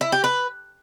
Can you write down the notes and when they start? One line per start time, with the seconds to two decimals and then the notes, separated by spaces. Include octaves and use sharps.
0.01 E4
0.12 G4
0.24 B4